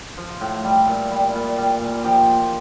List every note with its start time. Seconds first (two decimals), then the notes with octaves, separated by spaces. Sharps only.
0.17 F3
0.41 A2
0.64 G3
0.87 A#2
1.11 G3
1.35 A#2
1.58 G3
1.81 A#2
2.04 F3 G4